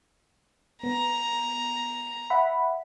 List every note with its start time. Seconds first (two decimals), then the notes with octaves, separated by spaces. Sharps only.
0.83 B3 A#5
2.30 E5 F#5 B5